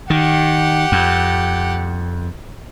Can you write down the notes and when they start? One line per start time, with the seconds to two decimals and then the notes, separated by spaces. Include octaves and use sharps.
0.10 D#3 G4 F#5
0.92 F2